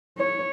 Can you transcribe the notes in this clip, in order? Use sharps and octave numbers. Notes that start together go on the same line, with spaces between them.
C#5